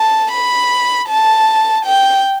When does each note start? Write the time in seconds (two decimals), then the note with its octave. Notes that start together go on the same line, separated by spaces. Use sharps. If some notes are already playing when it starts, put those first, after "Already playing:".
Already playing: A5
0.32 B5
1.09 A5
1.85 G5